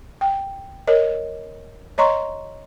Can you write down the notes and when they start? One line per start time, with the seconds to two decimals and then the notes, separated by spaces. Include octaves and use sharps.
0.21 G5
0.88 A#4 C#5 D#5
1.98 C#5 D#5 A#5 C6 C#6